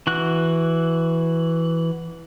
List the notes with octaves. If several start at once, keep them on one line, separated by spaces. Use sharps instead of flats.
E3 F#4 F#6